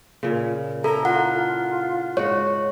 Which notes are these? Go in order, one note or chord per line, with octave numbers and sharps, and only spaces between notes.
A#2 C#3
E4 A4 A#5
F4 F#5
G#2 F#4 C#5